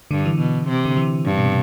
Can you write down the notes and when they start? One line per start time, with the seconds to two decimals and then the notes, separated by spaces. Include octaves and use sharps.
0.11 G2 D3
0.25 E3
0.39 B2
0.69 C3
0.85 D3
0.97 E3
1.25 G2
1.37 B2
1.45 C3